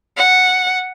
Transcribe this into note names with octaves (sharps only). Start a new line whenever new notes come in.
F#5